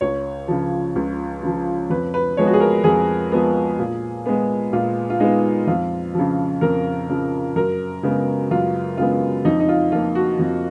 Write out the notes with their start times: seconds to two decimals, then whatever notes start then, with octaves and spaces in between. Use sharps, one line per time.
0.01 C#2 C#5
0.48 C#3 F3
0.96 C#2
1.43 C#3 F3
1.90 F2 B4
2.14 B4
2.37 F3 G#3 B3 C#5
2.47 F#4
2.53 G#4
2.60 A#4
2.84 F2 G#4
3.32 F3 G#3 B3
3.79 A#2
4.26 G#3 B3
4.73 A#2 F4
5.10 F4
5.20 G#3 B3 D#4
5.67 F2 F4
6.14 C#3 F3
6.61 F2 A#4
7.09 C#3 F3
7.56 F#2 A#4
8.03 C#3 G#3 B3
8.51 F#2 F4
8.97 C#3 G#3 B3 F4
9.45 F2 D#4
9.60 D#4
9.69 F4
9.92 F3 A#3 F4
10.15 F#4
10.39 F2